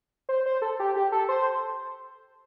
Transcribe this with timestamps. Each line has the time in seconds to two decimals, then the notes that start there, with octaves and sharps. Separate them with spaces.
0.29 C5
0.46 C5
0.62 A4
0.80 G4
0.96 G4
1.12 A4
1.29 C5